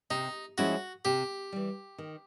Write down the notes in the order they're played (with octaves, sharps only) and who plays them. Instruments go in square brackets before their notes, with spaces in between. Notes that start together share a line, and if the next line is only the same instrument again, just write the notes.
[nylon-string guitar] C3 [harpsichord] D#4
[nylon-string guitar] F3 G#3 C#4 E4 [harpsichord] F#4
[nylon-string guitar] C3 [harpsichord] G4
[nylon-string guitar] E3 G3
D#3